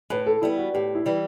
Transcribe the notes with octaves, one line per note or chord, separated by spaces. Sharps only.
A2 B4
A4
G3 B3 E4
F#4
A2 G4
E4
E3 G3